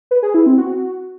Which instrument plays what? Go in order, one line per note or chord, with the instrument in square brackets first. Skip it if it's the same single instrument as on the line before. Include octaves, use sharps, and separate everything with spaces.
[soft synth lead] B4
G#4
E4
C4
F#4